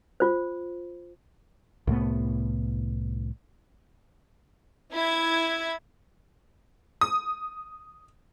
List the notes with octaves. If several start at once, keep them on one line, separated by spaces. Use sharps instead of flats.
F4 C5
C2 A2 A3 B3
E4 G#6
D#6